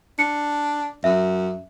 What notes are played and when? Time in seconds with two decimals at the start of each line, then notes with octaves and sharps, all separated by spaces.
0.19 D4 C#7
1.04 F#2 E5